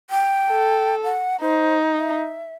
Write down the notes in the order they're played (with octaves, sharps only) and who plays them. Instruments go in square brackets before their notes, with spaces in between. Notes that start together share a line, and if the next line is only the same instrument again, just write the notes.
[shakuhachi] G5
[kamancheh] A4
[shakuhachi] F#5
[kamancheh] D#4 [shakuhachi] C5
[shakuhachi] E5